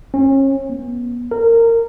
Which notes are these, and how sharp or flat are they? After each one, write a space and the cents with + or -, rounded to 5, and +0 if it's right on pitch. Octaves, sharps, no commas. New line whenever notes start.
C#4 -35
B3 -35
A#4 -20